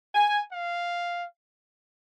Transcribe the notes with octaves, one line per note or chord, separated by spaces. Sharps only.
G#5
F5